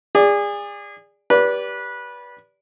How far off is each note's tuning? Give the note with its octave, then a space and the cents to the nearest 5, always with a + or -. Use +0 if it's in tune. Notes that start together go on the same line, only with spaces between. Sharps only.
G#4 -30 D5 +0
G4 +0 B4 -20 D5 -25